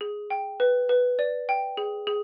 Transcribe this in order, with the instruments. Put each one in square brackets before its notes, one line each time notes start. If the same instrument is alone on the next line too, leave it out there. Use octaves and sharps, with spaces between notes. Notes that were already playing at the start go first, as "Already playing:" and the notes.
[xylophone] G#4
G5
B4
B4
D5
G5
G#4
G#4